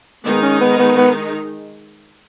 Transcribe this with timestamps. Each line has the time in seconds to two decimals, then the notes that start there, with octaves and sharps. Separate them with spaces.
0.25 D#3 G#3 B3 D#4
0.42 C#4
0.61 B3
0.79 B3
0.97 B3